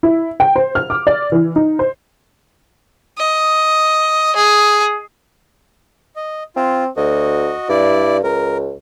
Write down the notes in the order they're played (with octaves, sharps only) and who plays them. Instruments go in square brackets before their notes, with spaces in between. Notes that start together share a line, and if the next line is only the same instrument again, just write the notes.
[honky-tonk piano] E4
G5
C5
F6
D6
D5
E3
D#4
C5
[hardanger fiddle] D#5
G#4
[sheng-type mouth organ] D#5
[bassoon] C4 [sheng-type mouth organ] F4
[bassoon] D2 [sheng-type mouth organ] F#4 D#5
[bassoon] G2 [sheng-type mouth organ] E4 D5
[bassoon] C#2 [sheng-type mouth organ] A#4